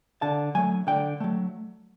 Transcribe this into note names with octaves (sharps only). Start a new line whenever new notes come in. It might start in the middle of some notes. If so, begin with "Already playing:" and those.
D3 A5
F#3 A3 G#5
D3 G5
F#3 A3